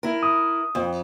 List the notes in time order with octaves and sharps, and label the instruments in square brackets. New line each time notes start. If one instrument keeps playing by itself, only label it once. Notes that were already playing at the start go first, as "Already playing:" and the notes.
[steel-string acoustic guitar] E4 A#4
[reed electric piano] D#6
[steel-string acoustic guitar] F2